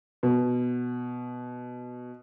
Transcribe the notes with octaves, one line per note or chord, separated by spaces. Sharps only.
B2